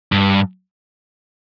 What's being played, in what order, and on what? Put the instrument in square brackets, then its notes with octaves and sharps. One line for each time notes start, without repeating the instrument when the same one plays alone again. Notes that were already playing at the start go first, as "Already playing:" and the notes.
[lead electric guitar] G2